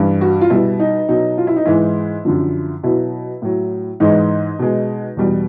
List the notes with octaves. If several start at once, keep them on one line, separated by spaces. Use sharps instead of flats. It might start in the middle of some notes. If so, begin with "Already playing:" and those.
Already playing: G2 E3 G3
F#4
F4
B2 G3 E4
D#4
B2 F#3 D#4
F4
E4
D#4
G#2 E3 G#3 E4
F#2 D3 F3
B2 F#3 E4
A2 F#3
G#2 E3 G#3 D#4
B2 G#3
E2 B2 G3